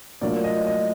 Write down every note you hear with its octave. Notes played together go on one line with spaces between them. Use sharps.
A2 F#3 A#3 D4 F4 D5
D#5
D#5